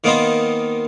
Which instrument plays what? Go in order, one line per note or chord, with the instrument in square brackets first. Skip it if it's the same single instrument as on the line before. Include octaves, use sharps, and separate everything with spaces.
[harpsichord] D#3 A#3 B3 D#4 C5